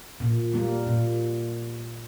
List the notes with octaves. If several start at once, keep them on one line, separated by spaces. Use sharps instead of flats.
A#2
G3 A#3
A#2